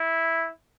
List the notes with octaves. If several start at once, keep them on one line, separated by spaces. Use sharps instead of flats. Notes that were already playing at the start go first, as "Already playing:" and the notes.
Already playing: E4